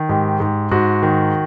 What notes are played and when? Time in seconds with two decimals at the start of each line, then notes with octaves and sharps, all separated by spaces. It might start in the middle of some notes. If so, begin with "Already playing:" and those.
Already playing: D#3
0.09 G#2 G4
0.40 G#2
0.71 G#2 F#4
1.03 D#3